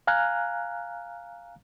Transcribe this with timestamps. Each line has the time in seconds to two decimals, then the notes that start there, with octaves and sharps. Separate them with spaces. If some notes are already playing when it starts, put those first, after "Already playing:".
0.07 F5 G#5 A#5 F6 F#6